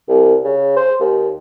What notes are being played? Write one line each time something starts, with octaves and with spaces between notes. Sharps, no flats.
C2
C#3
C5
D#2